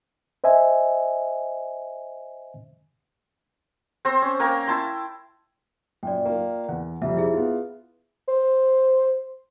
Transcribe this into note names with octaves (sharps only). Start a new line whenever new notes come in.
C5 D#5 E5 G#5
C4 C5
C#4
A#3 A#4 C#5 G5
E4 A5 C6
F#2 A#2 D5 G5
A#3 F4
E2 F#5
F2 C3 G3 E5
E4 G#4 E5
B3 F4
C5